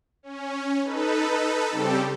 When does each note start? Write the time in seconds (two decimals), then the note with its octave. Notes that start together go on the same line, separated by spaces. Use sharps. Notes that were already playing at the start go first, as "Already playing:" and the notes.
0.23 C#4
0.83 D#4 A4 B4
1.70 C#3 G3 C4 G4 A4